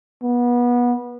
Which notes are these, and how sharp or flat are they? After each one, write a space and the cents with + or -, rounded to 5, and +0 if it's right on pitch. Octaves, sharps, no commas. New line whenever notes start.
B3 -25